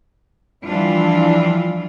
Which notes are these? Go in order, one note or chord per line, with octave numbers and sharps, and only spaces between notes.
E3 F3 G3 D4 E4 F4